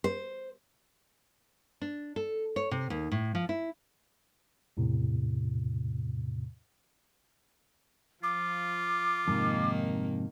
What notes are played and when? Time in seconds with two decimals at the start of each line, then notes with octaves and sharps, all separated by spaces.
0.04 C5
1.81 D4
2.16 A4
2.56 C#5
2.71 C3
2.90 D#2
3.12 A2
3.35 F3
3.49 E4
4.77 E2 A2 C3
8.23 F3 F4 D6
9.28 F2 G#2 C3 D#3 A#3 D#4